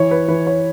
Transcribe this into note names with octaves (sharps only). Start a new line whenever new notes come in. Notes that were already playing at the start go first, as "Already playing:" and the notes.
Already playing: E3 C#5
B4
E3 B4
C#5